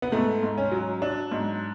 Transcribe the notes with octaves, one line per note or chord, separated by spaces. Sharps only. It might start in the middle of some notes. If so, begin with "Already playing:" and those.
B3
G#2 A3
G#2
C#4
F#3
F#3 D4
G#2